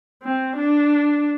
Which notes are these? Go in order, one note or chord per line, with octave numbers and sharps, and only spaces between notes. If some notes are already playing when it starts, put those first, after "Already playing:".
C4
D4